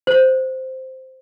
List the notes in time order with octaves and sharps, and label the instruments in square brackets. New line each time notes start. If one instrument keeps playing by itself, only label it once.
[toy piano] C5